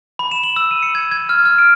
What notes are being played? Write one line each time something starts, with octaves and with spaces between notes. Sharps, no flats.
B5
E7
F#7
E6
D#7
C#7
G#6
G#6
F6
F6
D7